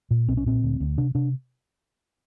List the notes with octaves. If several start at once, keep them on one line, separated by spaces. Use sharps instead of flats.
A#2
B1 C4
C#4
A#2 C4
D2
D2
C3 D4
C3 D4